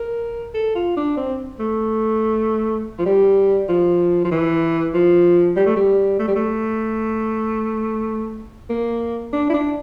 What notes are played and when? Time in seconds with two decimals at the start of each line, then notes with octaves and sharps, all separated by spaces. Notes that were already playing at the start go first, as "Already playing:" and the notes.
Already playing: A#4
0.54 A4
0.75 F4
0.97 D4
1.17 C4
1.59 A3
2.99 F3
3.06 G3
3.69 F3
4.25 F3
4.32 E3
4.94 F3
5.57 G3
5.66 A3
5.76 G3
6.19 A3
6.28 G3
6.36 A3
8.70 A#3
9.33 D4
9.50 E4
9.54 D4